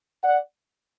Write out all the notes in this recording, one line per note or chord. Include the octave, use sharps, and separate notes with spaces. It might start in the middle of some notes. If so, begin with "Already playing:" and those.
D5 F#5